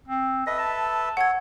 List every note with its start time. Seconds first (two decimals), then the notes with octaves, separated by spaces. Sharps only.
0.08 C4
0.47 A4 B4 D#5 E5
0.59 A5
1.17 A4 C#5 F#5 G#6